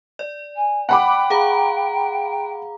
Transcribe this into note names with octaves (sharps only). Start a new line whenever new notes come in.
D5
G#5
F#5 G5 B5 D6
G#4 F5 A#5